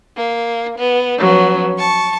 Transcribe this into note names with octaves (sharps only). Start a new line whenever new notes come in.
A#3
B3
F3 F#3 B3 C#4
A5 C#6